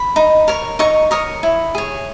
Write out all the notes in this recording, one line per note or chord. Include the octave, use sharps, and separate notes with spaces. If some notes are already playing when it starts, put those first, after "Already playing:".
Already playing: B5
D#4
A#4 C#5
D#4 C#6
A#4 C#5 D#6
E4
G#4 C#5